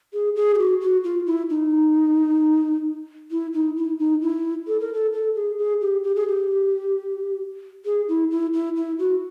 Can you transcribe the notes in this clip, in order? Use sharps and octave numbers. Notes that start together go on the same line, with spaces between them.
G#4
G#4
G4
F#4
F#4
F4
E4
D#4
E4
D#4
E4
D#4
E4
A4
A#4
A4
A4
G#4
G#4
G4
G4
G#4
G4
G#4
E4
E4
E4
E4
F#4